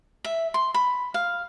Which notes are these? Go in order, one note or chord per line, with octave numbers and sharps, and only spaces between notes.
E5
C6
B5
F5